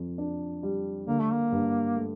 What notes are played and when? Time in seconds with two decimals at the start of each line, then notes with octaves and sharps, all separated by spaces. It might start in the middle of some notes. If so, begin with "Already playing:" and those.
Already playing: F2
0.18 D4
0.63 G3
1.07 D3 A#3
1.20 A3
1.33 A#3
1.52 G2
1.97 A3